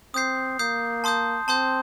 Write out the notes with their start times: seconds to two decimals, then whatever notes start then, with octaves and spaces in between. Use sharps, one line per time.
0.14 C4 D#6 G6 C7
0.59 A#3 D#6 G6 C7
1.04 A5 C6 D#6 G6
1.48 C4 A5 C6 D#6 G6